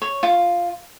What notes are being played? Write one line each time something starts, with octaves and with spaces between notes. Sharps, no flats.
C#5
F4